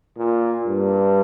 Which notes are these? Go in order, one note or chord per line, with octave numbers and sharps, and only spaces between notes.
A#2
G2